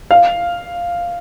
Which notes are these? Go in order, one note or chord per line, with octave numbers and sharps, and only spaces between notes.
F5